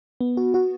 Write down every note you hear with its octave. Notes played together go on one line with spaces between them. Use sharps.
B3
F#4
F#4